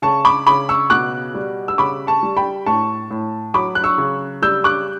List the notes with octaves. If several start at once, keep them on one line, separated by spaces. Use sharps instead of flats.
C#3 A5 C#6
B5 D6
C#3 B5 D6
C#6 E6
B2 D6 F#6
G3
E6
C#3 B5 D6
A5 C#6
G3
G5 B5
A2 A5 C#6
A2
F#3 B5 D6
F#6
C#6 E6
C#3
G3 E6 G6
D6 F#6